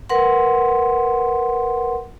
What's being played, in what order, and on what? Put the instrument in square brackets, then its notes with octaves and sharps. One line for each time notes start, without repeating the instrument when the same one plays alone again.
[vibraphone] A#4 B4 F#5 C6